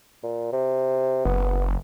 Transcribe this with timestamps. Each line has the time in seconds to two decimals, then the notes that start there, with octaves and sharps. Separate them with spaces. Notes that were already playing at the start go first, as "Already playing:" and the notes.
0.23 A#2
0.53 C3
1.25 F#1 B3